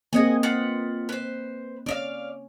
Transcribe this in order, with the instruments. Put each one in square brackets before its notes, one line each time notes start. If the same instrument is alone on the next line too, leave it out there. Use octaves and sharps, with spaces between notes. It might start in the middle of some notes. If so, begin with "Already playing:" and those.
[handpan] A#3 C4 D#5 [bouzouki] G#4 F#5 G#5
[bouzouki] F4 B4 F#5
B4 C5
[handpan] C#4 [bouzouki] D5 D#5 F5